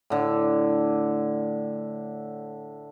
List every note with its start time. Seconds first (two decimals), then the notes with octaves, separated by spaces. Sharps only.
0.10 A2 D3